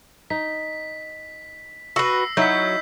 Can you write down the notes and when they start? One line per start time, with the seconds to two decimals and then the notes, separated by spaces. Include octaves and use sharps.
0.30 D#4 B6
1.96 F#4 B4 E6 A#6 C7
2.37 F#3 D#4 E4 G6 B6